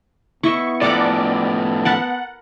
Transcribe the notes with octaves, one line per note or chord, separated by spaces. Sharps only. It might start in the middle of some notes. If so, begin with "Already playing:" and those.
B3 E4 D#5 E5 C#6
A2 F3 A4 D5 F#5 A#5 D6
A#4 F#5 A5 B5